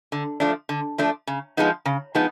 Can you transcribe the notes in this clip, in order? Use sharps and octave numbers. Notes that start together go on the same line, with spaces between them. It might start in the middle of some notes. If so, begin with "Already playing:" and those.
D3
F3 A3 D4
D3
F3 A3 D4
C#3
F3 G#3 B3 D#4
C#3
F3 G#3 B3 D#4